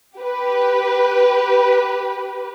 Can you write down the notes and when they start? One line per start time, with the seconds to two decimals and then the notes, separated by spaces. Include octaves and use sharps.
0.17 G4 B4